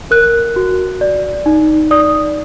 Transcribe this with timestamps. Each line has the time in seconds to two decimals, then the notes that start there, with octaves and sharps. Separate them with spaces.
0.11 A#4 F#6
0.56 F#4
1.01 D5
1.46 D#4
1.91 D5 D#6